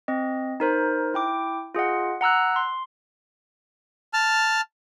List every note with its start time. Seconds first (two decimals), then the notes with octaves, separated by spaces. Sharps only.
0.08 C4 D#5
0.60 D#4 A#4 C5
1.14 E4 G5 D6
1.75 F4 G#4 D#5 F#5
2.21 F#5 A#5 E6 F#6
2.56 C6
4.13 A5 F6